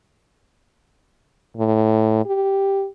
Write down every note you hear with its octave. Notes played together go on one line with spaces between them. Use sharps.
A2
G4